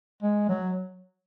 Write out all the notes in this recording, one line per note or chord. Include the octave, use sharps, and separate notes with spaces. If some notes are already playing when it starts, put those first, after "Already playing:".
G#3
F#3